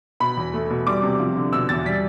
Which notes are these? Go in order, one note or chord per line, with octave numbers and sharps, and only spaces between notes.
B2 B5
E2
A3
B2
G3 D6
C3
F3
D3
B2 E6
E2 A6
G3 B6